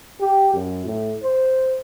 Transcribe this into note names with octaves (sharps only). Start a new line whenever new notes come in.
G4
F#2
A2
C5